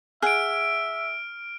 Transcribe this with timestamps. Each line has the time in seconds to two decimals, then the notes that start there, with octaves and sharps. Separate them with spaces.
0.22 G#4 E5 F#5 F6 D7